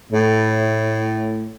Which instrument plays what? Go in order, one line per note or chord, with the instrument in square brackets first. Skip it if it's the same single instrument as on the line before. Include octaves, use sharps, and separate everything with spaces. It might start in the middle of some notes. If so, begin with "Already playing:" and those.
[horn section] A2